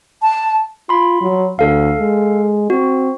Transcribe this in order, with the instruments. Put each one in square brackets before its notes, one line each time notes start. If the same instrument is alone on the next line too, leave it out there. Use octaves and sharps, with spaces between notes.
[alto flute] A5
[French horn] F4 [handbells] B5 C6
[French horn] F#3
[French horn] D2 [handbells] A4 F5
[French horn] G#3
[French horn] C4 [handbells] F#4